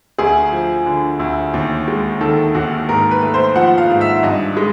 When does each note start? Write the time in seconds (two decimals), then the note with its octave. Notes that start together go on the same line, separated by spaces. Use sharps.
0.18 D2 G#4
0.52 F3
0.86 D3
1.19 D2
1.54 D#2
1.88 G#3
2.21 D#3 A4
2.54 D#2 F#4
2.89 G#2 A#4
3.11 B4
3.22 A3
3.34 C5
3.56 F3 F#5
3.78 F5
3.90 G#2
4.01 E5
4.23 G2 D#5
4.57 G#3